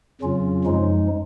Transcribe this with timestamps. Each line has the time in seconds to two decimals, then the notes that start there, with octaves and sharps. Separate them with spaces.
0.21 F2 C#3 F#3 C#4 F4
0.64 F#2 F3 G#3 D#4